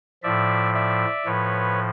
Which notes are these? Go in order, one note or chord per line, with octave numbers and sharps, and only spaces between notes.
A2 F3 D5 E5
D5 E5
A2 F3 B4 C#5